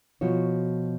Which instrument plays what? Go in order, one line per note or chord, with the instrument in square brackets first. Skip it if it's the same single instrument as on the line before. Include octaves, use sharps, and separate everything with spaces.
[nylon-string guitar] B2 F3 F#4 C#5